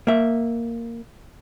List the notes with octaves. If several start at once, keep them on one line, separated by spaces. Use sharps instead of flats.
A#3 E5